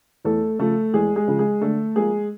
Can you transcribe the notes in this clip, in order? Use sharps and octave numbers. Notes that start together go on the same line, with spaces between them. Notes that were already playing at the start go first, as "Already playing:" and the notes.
E2 A3 A4
C#3 F3 A3 A4
E2 G#3 G#4
G#3 G#4
C#3 F3
G#3 G#4
D3 A3 A4
F3 G#3 A#3 G#4